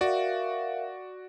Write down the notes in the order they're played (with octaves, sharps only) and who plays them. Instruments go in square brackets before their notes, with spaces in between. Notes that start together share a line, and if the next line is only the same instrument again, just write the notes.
[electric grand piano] F#4 D5 [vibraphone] A#4 E5 F5